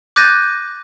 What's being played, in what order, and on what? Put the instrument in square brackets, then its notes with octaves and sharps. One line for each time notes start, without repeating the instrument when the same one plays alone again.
[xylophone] D6 F#6 G6 A6 A#6 D#7